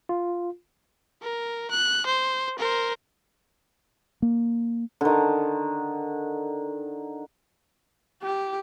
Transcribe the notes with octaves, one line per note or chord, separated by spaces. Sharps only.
F4
A#4
F#6
C5
A#4 C5
A#3
D3 D#3
G4